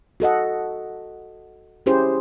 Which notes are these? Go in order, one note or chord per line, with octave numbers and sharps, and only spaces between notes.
F#4 A4 D#5 F#5
C#4 E4 G4 G#4 C5